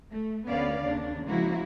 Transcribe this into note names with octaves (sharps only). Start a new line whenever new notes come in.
A3
D2 B3 C#4 D5 F5
D#2 C#3 D4
C#3 F3 G#3 A#3 E4 F#4